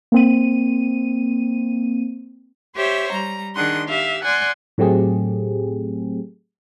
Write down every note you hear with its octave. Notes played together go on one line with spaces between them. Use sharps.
A#3 C4 D#7
G4 C5 C#5 E5
G3 A#5
D#3 D4 G#4 F#5 C6
G4 E5 F5
D5 F#5 G#5 C6
A2 F#3 A3 C4 G4 G#4